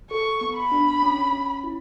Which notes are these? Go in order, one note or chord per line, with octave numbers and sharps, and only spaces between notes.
A4 C#6
B3
B5
D4
C#4
C#4
E4